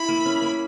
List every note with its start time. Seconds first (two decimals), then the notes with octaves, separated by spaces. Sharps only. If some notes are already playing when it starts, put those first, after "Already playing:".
Already playing: E4 B5
0.09 A#3
0.26 C#4
0.42 A#3